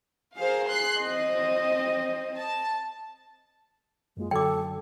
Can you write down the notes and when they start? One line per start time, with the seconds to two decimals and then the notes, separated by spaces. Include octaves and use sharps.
0.38 G#4 A#4 C5 F5
0.68 C6 F#6 C7
1.00 C4 D#5
2.37 A5
4.17 F#2 G#3 A#3 F4
4.31 F#2 D3 F#3 A4 G5 D6